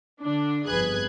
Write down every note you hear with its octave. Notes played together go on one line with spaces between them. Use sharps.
D3 D4
G1 F2 G#4 B4 F#6 G#6